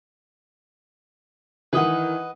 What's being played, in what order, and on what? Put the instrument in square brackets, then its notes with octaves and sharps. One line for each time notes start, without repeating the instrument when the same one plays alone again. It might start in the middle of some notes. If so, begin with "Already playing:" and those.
[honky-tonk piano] D#3 E3 [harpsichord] B4 D#5 F#5